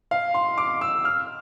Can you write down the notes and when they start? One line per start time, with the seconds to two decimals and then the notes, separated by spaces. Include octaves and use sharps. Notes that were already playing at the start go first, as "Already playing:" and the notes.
0.11 F5
0.34 C6
0.58 D6
0.81 E6
1.05 F6